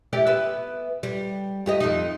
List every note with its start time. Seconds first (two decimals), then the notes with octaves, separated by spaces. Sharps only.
0.13 E4 G4 D5
0.27 B3 E5
1.03 G3
1.66 G2 G4 D#5
1.80 F2 D#4